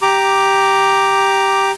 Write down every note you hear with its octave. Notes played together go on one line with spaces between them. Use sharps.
G4 A#5 D6